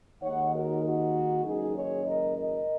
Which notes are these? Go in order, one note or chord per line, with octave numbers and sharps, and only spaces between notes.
D#2 D#3 G#3 D#4 C#5 F#5
F#4 A#4
F#4
F#1 F#2 D#3 G#3 D#4 G#4
G#4 C#5
A#4 D#5
A#4 D#5